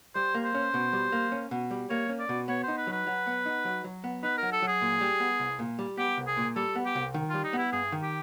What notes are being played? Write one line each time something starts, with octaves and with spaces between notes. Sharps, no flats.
G3 C5
A#3
C5
C#4
B2
G3
A#3
C#4
B2
G3
A#3 C#5
C#4
D5
B2
B3 C#5
D#4 C5
B4
F#3
B4
F#3
B3
D#4
F#3
F#3
B3
D#4 B4
F#3 A#4
A4
F#3
G#4
A#2
G3
B3
C2
A#2
G3
B3 G4
C2
G#4
A#2
G3 A4
B3
G4
C2
D#3
G3 F4
D#4
B3 E4
G2 G#4
D#3
G4